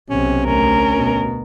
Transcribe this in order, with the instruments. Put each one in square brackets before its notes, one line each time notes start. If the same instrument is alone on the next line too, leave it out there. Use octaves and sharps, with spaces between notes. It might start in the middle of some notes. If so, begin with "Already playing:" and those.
[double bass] B1 C3 [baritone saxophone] C#4
[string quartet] D2 A#4 [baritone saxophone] C#4
[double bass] B2